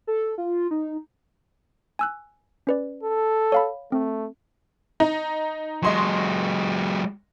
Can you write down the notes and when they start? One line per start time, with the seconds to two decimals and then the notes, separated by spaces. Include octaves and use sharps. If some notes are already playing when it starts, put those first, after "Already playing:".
0.07 A4
0.38 F4
0.71 D#4
1.99 G#5 E6 F#6
2.67 C#4 B4 D5
3.03 A4
3.52 C#5 F5 B5
3.92 A3 C4
5.00 D#4
5.83 F#3 G#3 D#5 C6 C#6